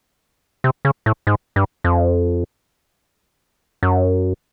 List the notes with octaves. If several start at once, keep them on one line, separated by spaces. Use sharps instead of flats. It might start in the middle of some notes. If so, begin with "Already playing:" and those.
C3
C#3
A2
G#2
G2
F2
F#2